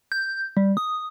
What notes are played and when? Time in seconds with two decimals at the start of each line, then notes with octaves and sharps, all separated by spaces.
0.12 G6
0.57 G3
0.77 D#6